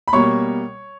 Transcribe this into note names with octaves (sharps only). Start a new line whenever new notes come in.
B5
B2 G3 A#3 C#5 C#6